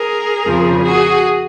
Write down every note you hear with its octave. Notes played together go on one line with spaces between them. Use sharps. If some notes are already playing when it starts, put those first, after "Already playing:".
Already playing: G#4 A#4
F2 C#3 F3
F#4 G#4